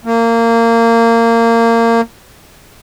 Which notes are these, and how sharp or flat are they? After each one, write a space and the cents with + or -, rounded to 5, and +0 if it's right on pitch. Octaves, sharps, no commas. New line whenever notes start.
A#3 -20